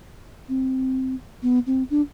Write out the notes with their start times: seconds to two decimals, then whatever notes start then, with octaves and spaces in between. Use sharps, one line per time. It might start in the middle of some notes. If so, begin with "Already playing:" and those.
0.49 C4
1.43 B3
1.67 C4
1.90 D4